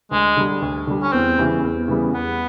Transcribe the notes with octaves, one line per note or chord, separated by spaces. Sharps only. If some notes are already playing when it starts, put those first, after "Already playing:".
D2 G#3
D3 G3
D2
D3 G3
C#4
E2 C4
C#3 E3 G3 B3
E2
C#3 E3 G3 B3
E2 B3